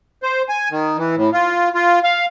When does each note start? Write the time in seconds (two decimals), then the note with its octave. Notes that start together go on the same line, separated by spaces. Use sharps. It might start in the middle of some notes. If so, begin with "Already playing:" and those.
0.23 C5
0.49 G#5
0.71 D#3
0.97 E3
1.16 A2
1.33 F4
1.75 F4
2.04 F5